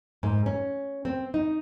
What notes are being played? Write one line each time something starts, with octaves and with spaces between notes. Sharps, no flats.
G#2
C#4
C4
D#4